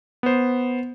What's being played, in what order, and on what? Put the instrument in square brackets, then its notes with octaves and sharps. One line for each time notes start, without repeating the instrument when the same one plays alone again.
[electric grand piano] B3 C5